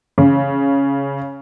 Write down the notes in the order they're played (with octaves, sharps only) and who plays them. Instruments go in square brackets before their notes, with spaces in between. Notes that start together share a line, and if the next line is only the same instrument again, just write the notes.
[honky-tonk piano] C#3